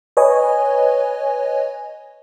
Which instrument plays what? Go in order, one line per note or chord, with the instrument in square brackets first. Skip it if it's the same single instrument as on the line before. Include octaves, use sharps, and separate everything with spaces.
[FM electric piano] B4 C#5 D#5 G#5